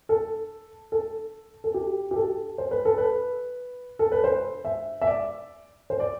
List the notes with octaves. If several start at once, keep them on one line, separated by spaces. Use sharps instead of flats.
A4
A4
A4
G4
G4
A4
C5
B4
A4
B4
A4
B4
C5
E5
E5
D5
C5
D5